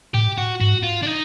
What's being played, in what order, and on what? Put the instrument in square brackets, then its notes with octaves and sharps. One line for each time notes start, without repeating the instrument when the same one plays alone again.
[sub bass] A2 [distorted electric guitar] G4
[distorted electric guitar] F#4
[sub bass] G#2 [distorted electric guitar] F#4
[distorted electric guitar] F4
D4
D#4